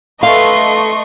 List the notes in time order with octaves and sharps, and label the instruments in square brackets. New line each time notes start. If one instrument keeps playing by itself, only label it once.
[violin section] A3 D#5 C#6 [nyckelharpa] A4 B4 [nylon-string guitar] F5 [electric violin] C6